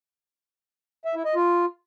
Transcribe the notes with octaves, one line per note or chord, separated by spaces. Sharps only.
E5
E4
D#5
F4